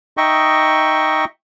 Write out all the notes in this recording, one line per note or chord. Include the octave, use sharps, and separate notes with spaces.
D#4 D#5 E5 G5 C#6